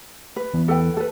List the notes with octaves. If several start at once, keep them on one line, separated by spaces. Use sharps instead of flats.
B4
E2
A4 B4 G5
A4 B4